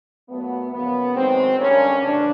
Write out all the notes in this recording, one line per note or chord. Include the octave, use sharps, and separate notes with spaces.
A#2 F#3 A3 B3
F#2 C#3 F3 A#3 B3
F#2 D#3 G#3 C4
F2 D3 G3 A#3 C#4
D2 C#3 E3 D4